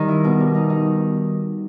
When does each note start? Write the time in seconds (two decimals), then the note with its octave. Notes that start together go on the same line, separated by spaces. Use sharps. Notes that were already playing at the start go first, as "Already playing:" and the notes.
Already playing: D#3 G3
0.08 E4
0.24 B2
0.40 G3
0.55 D#4
0.70 D#4